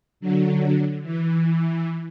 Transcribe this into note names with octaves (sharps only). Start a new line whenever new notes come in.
D3 F#3
E3